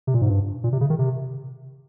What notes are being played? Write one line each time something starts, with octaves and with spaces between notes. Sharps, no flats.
C3
A#2
G#2
G2
A#2
C3
C#3
D#3
C3